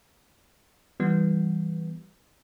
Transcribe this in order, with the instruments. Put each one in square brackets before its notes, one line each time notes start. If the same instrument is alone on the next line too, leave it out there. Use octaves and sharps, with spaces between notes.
[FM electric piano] E3 G3 B3